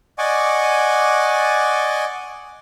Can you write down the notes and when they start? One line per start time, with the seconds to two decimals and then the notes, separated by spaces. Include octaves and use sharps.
0.18 D5 D#5 F#5 G#5 C#6 D6